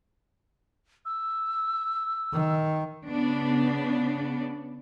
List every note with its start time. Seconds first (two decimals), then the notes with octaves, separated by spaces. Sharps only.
1.05 E6
2.32 D#3
3.07 C#3 B3 D4